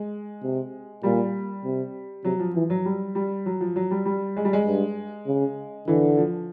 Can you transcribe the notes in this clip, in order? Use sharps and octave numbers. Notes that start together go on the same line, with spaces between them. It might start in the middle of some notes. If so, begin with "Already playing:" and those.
Already playing: G#3
C3
A#2 G3
C3
C3 F#3
F3
E3 F3
F#3
G3
G3
F#3
F3
F#3
G3
G3
G#3
G3
G#3
G2
C#3
D3 E3
F3